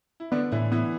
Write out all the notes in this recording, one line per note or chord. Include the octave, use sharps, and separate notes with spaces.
E4
D3 B3 D4
A2 E3 E4
E3 B3 E4